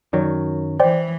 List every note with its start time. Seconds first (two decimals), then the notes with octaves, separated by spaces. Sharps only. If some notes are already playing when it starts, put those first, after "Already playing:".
0.13 F#2 D#3 F#3 C#5 D5
0.80 E3 C5 D5 G5